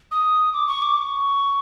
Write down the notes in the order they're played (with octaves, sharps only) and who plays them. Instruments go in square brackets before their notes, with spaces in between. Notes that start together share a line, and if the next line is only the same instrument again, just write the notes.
[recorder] D#6
D6
C#6
D6
C#6